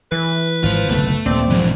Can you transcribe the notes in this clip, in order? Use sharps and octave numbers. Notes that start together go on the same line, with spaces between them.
E3 B4
G#1 F4 C5
F#1 B1 D3 A3
D#1 D#2 C4 D5
A#1 G2 A#2 E3 G#3